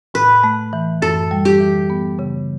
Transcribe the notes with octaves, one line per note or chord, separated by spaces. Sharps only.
A2 B4
A3
E3
F#2 A4
G3
G4
E3
B3
C#3